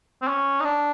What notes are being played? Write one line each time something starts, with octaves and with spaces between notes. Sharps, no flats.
C4
C#4
D#4
D4